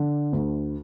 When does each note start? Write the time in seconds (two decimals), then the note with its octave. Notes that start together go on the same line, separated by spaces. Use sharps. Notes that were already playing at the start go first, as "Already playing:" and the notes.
Already playing: D3
0.32 D2